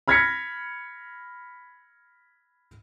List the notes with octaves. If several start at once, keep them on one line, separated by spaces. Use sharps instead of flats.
B5 F6 G#6 A#6 B6 C#7